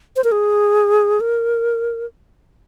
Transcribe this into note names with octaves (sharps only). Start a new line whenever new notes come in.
C5
A#4
G#4
A#4